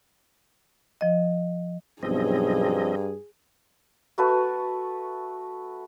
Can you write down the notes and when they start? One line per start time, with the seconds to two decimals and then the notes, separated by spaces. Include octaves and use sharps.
1.01 F3 D#5
2.03 B1 G2 F3 C4 G#4 D#5
4.18 A3 F#4 B4 A5